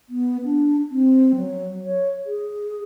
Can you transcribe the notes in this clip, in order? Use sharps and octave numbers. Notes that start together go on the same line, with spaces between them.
B3
D4
C4
F#3
C#5
G#4